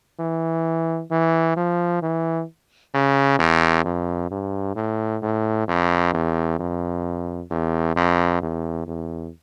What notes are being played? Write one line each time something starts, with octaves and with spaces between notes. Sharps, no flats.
E3
E3
F3
E3
C#3
E2
F2
G2
A2
A2
F2
E2
F2
E2
F2
E2
E2